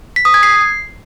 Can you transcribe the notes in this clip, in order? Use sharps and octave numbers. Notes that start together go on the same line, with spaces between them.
B6
D#6
G#6
C7